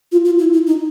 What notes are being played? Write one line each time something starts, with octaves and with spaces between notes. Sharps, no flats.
F4
F4
E4
E4
D#4